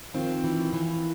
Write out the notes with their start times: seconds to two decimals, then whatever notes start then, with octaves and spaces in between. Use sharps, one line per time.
0.14 D#3 F3 C4
0.44 E3
0.73 E3